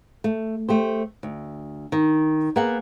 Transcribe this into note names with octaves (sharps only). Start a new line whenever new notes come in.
A3
A3 G4 C5
D2
D#3
A#3 B3 G#4 A#4 F#5